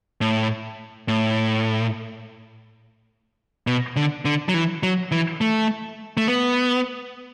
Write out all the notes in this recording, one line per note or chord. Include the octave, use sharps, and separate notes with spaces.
A2
A2
B2
D3
D3
F#3
E3
F#3
E3
A3
A3
B3